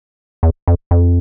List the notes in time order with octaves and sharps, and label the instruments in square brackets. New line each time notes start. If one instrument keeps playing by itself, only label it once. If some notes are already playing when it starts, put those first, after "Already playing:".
[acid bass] E2
F2
F2